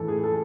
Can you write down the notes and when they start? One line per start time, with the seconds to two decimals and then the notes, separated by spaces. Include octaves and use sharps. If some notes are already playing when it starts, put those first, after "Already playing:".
Already playing: A2 E3 A4
0.08 G#4
0.23 A4